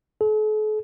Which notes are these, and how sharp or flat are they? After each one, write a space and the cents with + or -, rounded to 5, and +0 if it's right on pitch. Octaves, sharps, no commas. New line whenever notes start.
A4 -45